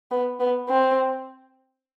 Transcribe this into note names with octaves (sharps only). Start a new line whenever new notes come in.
B3
B3
C4